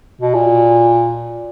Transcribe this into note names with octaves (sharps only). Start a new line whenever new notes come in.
B2
A#2